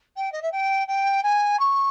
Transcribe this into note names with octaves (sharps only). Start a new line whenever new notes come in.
G5
D#5
E5
G5
G5
G#5
C#6